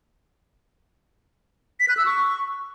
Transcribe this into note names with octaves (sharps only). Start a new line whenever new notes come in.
B6
F#6
E6
C#6